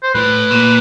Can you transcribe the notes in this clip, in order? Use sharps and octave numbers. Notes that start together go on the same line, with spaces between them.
C5
A2 B4
A#2